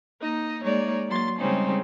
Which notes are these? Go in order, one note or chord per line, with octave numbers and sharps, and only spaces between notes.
A#3 D#4 D#5
G#3 A#3 D#4 C#5 D5
F#3 A#3 C6 A6
C#3 G3 G#3 C4 C#4 D#4